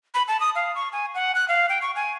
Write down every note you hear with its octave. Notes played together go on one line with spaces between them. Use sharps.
B5
A5
D#6
F5
C#6
G#5
F#5
F#6
F5
G5
C#6
G#5